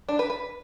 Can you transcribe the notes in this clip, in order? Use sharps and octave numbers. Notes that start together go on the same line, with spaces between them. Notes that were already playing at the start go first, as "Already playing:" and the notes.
D4
B4
B4